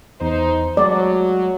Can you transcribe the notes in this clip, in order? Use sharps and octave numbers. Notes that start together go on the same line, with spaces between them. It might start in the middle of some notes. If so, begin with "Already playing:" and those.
E2 D#4 C5
F#3 G#3 A3 D5